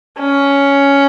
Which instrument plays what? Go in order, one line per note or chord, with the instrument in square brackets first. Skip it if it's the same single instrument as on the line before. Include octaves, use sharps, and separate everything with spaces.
[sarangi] C#4